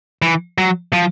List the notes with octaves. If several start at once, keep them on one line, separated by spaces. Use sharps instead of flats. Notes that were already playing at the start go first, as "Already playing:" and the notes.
E3
F#3
F3